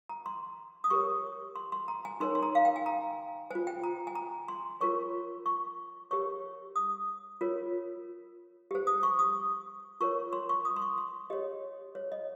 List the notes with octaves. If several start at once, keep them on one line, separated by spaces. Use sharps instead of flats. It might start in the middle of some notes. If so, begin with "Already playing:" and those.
A#5
C6
D#6
G4 A#4 C#5 C#6
C6
C6
A#5
G#5
D#4 A#4 C#5 C6
C6
A#5
F5
G5
G#5
A#5
F4 C5 G#5
G5
A#5
G#5
A#5
C6
F4 A#4 C#5 C#6
C#6
G4 A#4 C#5 C#6
D#6
F4 A#4 C#5
G4 C5
D#6
C#6
D#6
F4 A#4 C#5 C#6
C6
C#6
D#6
C6
C#6
C6
G4 C#5 D#5
C#5
D#5